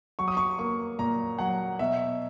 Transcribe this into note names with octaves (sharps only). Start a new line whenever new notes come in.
F#3 C#6
D#6
C#6
A#3 C#6
A#2 A#5
F#3 F#5
B2 E5